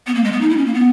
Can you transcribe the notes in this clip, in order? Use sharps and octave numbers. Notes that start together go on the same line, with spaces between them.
B3
A#3
G#3
B3
D#4
E4
C#4
A#3
B3